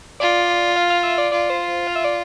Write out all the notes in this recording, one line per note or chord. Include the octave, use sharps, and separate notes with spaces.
F4 D5
F5
F5
E5
D5
F4 D5
C5
F5
E5
D5